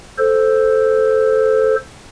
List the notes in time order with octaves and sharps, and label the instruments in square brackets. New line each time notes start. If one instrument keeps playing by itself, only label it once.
[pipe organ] A4 C5